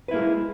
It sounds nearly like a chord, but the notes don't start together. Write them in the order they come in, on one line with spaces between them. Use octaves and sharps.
B4 E4 A#3 G#4 G#3